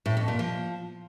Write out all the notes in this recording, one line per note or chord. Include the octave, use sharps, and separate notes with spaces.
A2
F2
A#2
F3